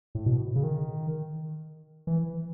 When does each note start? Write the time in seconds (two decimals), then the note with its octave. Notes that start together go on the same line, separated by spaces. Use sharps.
0.15 A2
0.26 B2
0.56 C#3
0.63 D#3
2.07 E3